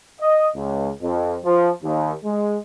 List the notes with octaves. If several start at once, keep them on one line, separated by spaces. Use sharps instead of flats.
D#5
C#2
F2
F3
D#2
G#3